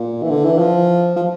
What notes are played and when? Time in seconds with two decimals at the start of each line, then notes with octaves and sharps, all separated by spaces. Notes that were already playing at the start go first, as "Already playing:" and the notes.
Already playing: A#2
0.23 E3
0.30 D3
0.44 E3
0.58 F3
1.16 F3